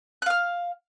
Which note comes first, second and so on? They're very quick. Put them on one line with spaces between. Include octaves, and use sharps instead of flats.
F#6 F5 F6